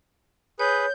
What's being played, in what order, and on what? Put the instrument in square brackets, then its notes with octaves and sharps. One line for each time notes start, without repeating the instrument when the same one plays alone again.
[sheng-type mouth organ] G#4 B4 [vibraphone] C#5 [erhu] G6